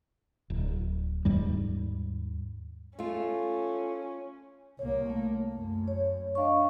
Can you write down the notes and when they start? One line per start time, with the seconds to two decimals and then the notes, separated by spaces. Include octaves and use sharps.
0.50 D1
1.25 D#2 G#2 G3
2.99 A3 C#4 F4
4.79 C2 A#3 C#5
5.10 A3
5.54 F#2
5.88 C#5
6.35 D4 D#5 F5 C#6